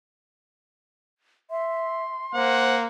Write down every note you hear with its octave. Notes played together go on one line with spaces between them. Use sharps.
E5 C6
A#3 C5 F#5